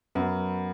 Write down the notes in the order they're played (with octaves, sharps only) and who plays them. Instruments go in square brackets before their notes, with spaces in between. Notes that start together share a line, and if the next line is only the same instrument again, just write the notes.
[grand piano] F#2 [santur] B3